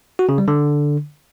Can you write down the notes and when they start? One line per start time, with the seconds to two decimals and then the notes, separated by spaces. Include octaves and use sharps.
0.19 F#4
0.29 C#3
0.38 G3
0.48 D3